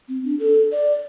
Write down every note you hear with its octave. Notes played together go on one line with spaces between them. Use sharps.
C4
D4
A4
D5